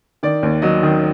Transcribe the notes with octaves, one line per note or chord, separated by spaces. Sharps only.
D#3 D5
D#2
F#3 D#5
D#3